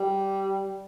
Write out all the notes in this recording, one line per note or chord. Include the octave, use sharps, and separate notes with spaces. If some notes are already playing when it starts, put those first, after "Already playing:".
Already playing: G3